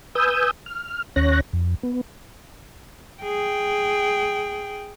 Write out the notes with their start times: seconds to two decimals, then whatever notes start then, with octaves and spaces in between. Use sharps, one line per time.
0.15 B4 G#5 D#6 E6 G6
0.66 F6
1.16 D#2 C#4 C#5 F#6 A#6
1.53 F2
1.83 B3
3.23 G#4 G5